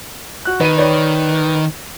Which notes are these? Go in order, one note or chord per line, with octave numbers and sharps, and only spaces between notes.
F#4 F#6
D#3 B4 D#7
B4 C#5 D5